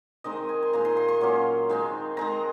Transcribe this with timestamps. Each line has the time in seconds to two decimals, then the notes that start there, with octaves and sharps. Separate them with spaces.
0.24 D#3 G#3 C4 D#4 D#5
0.49 G#5
0.63 C6
0.73 A#2 G#3 D#4 A#5
0.85 C6
0.97 C6
1.08 C6
1.21 A#2 F#3 A#3 C#4
1.69 D#3 G#3 C4 D#4
2.17 D#3 G#3 C4 A#5